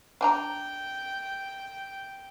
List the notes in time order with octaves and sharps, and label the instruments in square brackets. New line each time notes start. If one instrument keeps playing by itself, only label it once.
[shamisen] D4 G#5 A#5 [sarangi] G5